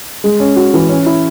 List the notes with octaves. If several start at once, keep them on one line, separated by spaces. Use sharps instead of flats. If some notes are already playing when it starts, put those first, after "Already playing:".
G#3
C#4
F#4
E3
C#4
E4